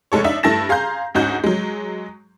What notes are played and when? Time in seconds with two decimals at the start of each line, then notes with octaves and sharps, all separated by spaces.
0.12 F1 G#3 A4 C#5
0.24 D4 D#4 E5
0.43 G2 A3 E4 A5 A#6 E7
0.69 G#4 F5 A#5 C6 G6
1.15 D2 G#2 C#4 D#4 F#4 G6
1.44 F#3 G#3